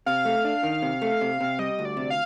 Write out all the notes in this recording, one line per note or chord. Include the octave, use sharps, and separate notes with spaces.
C3 F5
A3
D4
D#3
C3
A3
C3
C3
G3 D#5
D2
D5
C3
F5